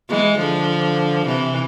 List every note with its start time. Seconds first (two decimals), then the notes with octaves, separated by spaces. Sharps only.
0.09 E3 G#3
0.38 D3 F3
1.26 C3 E3